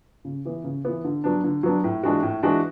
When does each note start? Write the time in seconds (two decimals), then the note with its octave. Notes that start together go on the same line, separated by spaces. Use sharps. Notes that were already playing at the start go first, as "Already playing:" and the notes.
0.25 C#3
0.45 E3 B3
0.64 C#3
0.85 E3 B3
1.05 D3
1.24 F#3 B3 D4
1.44 D3
1.63 F#3 B3 D4
1.84 A2
2.03 E3 G#3 D4 F#4
2.23 A2
2.43 E3 G#3 D4 F#4